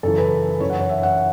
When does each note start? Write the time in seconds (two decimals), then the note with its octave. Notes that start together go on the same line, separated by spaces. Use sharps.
0.03 F#2 C#3 E3 A4
0.18 B4
0.60 F#2 E3 C#5
0.70 F#5
0.79 C#5
0.89 E5
1.03 F#5